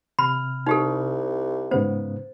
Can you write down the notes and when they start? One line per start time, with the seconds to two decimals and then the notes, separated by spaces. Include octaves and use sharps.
0.19 C3 B5 F6
0.67 C2 D#4 G4 A4
1.71 G#2 C#3 B3 C5